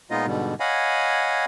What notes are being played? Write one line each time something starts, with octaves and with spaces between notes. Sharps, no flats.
A#2 G#3 B3 D#4 F4 D#5
G#2 B2 D3 G3
C#5 D#5 F5 F#5 G#5 B5